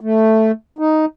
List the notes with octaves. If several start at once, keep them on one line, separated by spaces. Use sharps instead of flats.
A3
D#4